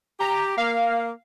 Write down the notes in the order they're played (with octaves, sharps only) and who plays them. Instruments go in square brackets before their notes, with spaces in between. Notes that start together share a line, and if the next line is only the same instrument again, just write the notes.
[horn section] G4 [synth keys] A#5
[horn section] A#3 [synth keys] F5